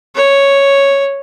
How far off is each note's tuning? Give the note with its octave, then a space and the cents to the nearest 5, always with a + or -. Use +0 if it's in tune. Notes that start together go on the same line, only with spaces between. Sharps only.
C#5 +0